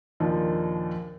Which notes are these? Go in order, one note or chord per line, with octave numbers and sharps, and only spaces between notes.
D#2 A#2 F3 D4 D#4